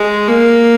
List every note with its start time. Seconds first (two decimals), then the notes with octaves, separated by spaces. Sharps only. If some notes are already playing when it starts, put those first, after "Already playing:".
Already playing: G#3
0.27 A#3